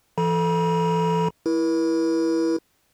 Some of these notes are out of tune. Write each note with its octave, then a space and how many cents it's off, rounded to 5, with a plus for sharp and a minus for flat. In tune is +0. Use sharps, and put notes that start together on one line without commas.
E3 +30 A4 +0 B5 -45
E4 +0 A#4 +45